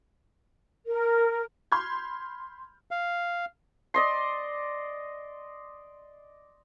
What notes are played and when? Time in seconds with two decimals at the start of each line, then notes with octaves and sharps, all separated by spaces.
0.86 A#4
1.72 B5 C6 F6 G6 G#6
2.91 F5
3.94 D5 D#5 C6